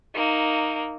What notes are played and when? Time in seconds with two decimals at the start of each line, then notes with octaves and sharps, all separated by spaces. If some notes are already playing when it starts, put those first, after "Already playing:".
0.14 A#3 D#4